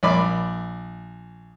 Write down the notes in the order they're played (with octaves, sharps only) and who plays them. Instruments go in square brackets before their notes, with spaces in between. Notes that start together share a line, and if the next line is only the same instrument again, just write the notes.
[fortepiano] A#1 D5 B5 D6